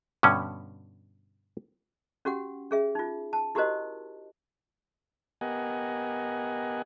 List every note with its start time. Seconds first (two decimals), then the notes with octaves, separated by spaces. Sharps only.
0.23 G2 B2 D3 C#4
2.25 C#4 F#4 G4 F#5
2.71 C#4 G#4 E5
2.95 D#4 F4
3.33 A5
3.55 E4 F#4 G4 A#4 C5 D#5
5.41 B3 G4 A#4 D#5 F#5 G#5